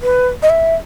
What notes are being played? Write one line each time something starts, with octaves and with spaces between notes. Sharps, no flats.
B4
D#5
E5